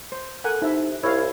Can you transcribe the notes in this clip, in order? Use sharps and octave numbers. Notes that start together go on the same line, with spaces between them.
C5
A4 A#4 F#5 G#5 F#6
C3 D#4 E4 E5
C2 E4 C#5 F5 B5 E6 G#6